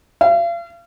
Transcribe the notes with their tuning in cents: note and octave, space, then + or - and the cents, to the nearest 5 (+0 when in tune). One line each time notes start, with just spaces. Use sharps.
F5 -40